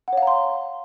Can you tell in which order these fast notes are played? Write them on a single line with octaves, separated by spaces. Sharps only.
F#5 C#5 F5 A#5 C6